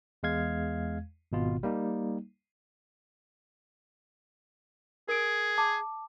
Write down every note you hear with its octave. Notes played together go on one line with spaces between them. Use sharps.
E2 G#3 F5 G#6
G#1 B2 F4
G3 A#3 D#4
G#4 A#4 D7
A5 D6